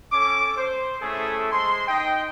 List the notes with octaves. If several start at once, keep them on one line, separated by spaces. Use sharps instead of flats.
C#4 A4 D6
C5
A3 C#4 E4 G#4 A4
G#3 C5 C6
D#4 D#5 G5